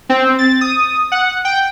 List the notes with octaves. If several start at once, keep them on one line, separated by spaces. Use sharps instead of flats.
C4
A6
D#6
F#5
G5